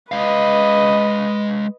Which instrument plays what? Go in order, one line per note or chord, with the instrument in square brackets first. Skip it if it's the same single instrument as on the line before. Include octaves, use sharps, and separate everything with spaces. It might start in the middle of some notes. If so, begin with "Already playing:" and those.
[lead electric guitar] G#3 F5 [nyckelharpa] B4 D#5